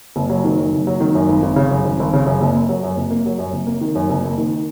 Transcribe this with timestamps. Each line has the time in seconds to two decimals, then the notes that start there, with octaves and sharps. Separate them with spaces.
0.16 F#1
0.30 F#3
0.44 D#3
0.59 F#2
0.73 F#1
0.87 F#3
1.00 D#3
1.15 F#2
1.29 G#1
1.43 G#1
1.56 C#3
1.71 F#2
1.84 G#1
1.99 G#1
2.13 C#3
2.27 F#2
2.41 F#1
2.54 A#3
2.69 F#3
2.83 F#2
2.97 F#1
3.11 A#3
3.26 F#3
3.39 F#2
3.53 F#1
3.67 A#3
3.81 D#3
3.95 F#2
4.10 F#1
4.24 A#3
4.38 D#3